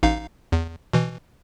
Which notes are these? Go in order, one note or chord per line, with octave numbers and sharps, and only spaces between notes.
A1 D#4 F5
E2
B2 E3